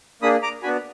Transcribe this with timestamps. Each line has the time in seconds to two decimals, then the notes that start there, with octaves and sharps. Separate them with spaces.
0.22 A#3 D4 G#4 B5 D#6
0.42 A#5 D6
0.63 B3 D4 F#4 G#5 B5